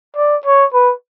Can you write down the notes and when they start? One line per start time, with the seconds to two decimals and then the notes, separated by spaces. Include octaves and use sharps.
0.16 D5
0.45 C#5
0.73 B4